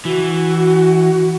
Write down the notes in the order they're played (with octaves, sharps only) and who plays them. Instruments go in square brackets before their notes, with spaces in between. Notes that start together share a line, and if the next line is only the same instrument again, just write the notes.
[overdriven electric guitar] E3 [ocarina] F#4